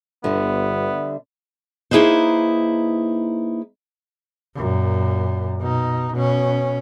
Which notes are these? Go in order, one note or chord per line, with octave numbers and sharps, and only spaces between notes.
G1 D3 G3 B3 E5
A#3 D#4 E4 G#4 B4 C5
F#2 A#2
B2 D#4
B2 C#4